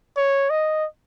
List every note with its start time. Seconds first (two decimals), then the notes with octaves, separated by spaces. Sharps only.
0.17 C#5
0.50 D#5